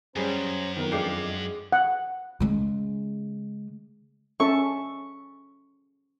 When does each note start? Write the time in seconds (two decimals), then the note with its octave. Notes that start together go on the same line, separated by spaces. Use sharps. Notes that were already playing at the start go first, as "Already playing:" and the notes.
0.16 F#2 G3 C#4 G#4 C5 A#5
0.77 F2 D#3 B3 A#4
0.92 F3 G#3 D4 G5 D6 C7
1.72 F#5
2.40 C#3 G#3
4.40 C#4 A4 E5 C#6